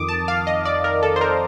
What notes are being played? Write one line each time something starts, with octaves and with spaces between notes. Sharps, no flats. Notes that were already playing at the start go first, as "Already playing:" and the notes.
Already playing: F2 D#3 D6 D#6
A5
F5
D#5
D5
A#4
A4
C5
A#4